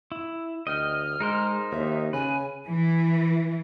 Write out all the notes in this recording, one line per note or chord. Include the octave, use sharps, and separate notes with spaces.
E4
D2 D#5 G5 F6
G#3 D#4 A#4 C5
D#2 E5
C#3 B4 G#5
E3